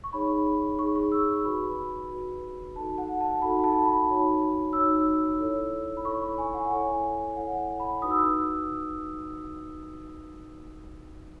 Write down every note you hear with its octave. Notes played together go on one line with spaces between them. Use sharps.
C#6
D#4 G#4 C#5 B5
D#4 G#4 C#5 C#6
C#6
E6
F#4 B4 B5
F#4 B4
D#4 F#4 A4 A5
F#5
A5
D#4 F#4 A4 B5
A5
B5
D#4 F#4 C#5
D#4 F#4 C#5 E6
E4 A4 C#5
B5
E4 A4 C#5 C#6
C#6
G#5
F#5
E4 A4 C#5 G#5
E4 A4 C#5 F#5
B5
D#4 F#4 B4 D#6
E6
D#6